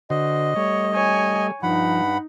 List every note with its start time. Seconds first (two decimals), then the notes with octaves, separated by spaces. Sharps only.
0.10 D3 F#4 C5 D#5
0.56 G3 A3 C#5
0.94 C#5 G#5
1.63 G2 F3 D#4 F#5 B5